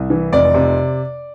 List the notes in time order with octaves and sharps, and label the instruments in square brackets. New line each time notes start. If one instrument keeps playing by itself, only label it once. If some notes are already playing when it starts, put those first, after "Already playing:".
Already playing: [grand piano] C2
E3
F1 D5
C3